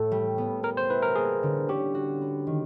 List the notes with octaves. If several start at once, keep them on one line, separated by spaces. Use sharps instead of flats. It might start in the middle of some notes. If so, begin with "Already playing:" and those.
Already playing: A2 A3 A4
G3
B3
B3 A#4
C5
E4 B4
A#4
A#3 G#4
D3
C#4 G4
F#4
B3
D#3